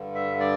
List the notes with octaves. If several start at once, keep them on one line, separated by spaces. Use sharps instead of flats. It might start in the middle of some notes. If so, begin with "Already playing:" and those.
Already playing: G2 D3
E5
D5